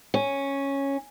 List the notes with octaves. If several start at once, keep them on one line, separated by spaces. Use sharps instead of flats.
C#4